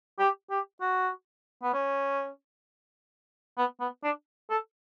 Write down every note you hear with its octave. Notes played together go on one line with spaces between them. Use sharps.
G4
G4
F#4
B3
C#4
B3
B3
D4
A4